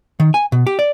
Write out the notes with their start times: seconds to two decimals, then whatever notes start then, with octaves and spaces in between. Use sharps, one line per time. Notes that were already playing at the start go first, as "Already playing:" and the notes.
0.20 D#3
0.34 G#5
0.52 B2
0.67 G4
0.79 D5